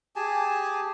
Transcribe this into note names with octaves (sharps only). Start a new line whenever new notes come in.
G4 G#4 G#5 A5